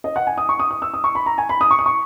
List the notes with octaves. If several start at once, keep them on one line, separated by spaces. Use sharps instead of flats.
D#5
F#5
G#5
D#6
C#6
D#6
D#6
E6
D#6
C#6
B5
A#5
G#5
B5
D#6
C#6
D#6
C#6